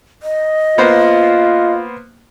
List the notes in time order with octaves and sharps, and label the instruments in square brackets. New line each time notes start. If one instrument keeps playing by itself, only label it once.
[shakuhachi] D#5
[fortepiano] A#3 B3 C5 [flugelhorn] F4